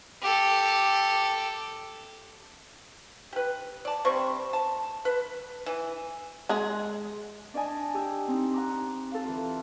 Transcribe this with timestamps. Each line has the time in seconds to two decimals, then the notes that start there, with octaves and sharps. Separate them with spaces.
0.22 G4 A4
3.33 G4 B4
3.85 D5 A5
4.05 C3 G3 C4 C#6
4.53 A5
5.05 B4
5.66 E3
6.49 G#3 G#4
7.54 D4 D5 D#5 G#5 A5
7.94 G4 G#5 E6
8.28 C4 D#4
8.54 F#5 A#5 D6
9.12 A4 F5
9.25 E3 F4